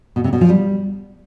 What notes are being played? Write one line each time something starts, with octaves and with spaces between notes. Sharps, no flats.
B2
C3
B2
F3
G3